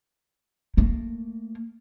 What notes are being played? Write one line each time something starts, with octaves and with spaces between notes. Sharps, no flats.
A3 A#3